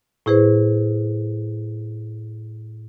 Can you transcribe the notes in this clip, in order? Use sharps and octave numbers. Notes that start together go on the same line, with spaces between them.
A2 E4 G#4 B4 C5